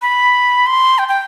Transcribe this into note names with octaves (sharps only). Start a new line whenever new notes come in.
B5
C6
G5
G5